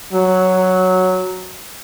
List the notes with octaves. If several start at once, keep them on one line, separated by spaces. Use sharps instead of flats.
F#3